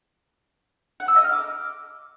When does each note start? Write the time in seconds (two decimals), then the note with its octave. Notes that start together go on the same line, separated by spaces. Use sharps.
1.00 F#5
1.08 E6
1.16 D#5
1.24 F6
1.32 D6